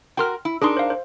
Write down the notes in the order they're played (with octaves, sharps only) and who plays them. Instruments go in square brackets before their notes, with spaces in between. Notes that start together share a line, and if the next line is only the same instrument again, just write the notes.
[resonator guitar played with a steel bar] F#4 A#4 [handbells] G5 C6 F6
[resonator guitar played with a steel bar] E4
[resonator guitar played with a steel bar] D4 D#4 A#4 [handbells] G#4 C6
[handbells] C5 F5
C5